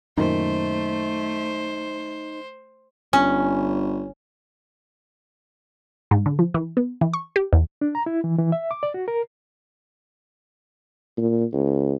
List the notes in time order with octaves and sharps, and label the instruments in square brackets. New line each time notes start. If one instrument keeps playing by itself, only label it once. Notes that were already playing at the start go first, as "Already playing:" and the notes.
[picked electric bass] F#2 A#2 D#3 [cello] A3 [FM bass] D#4 [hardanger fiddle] C5
[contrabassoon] G1 [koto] C#4
[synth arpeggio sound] G#2
D3
F3
E3
B3
E3
C#6
G4
E2
[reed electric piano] D4
A#5
E4
E3
E3
E5
D6
D5
F#4
A#4
[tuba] A#2
C#2